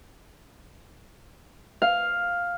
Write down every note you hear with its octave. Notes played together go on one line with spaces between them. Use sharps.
F5